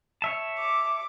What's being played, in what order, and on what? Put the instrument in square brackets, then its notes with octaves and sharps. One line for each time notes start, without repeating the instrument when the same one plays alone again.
[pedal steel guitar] C#5 E5 A5
[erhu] D6